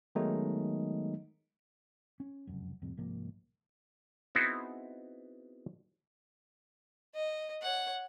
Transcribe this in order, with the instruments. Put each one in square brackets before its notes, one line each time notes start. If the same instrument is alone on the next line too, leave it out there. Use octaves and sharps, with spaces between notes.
[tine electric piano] D#3 F#3 G#3 A3 B3 D#4
[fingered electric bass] C#4
F1 C#2 F#2
C2 F2 A2 C3
C2 G#2 F3 A#3
[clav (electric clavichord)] B3 C4 D#4 E4 F#4 G#4
[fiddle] D#5
C#5 F#5